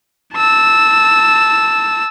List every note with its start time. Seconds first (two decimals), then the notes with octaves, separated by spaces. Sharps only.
0.34 A5 E6